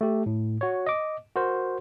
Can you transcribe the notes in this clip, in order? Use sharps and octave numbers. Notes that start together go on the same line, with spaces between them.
A3 G4
A2
F#4 C#5
D#5 D6
F#4 A#4 C5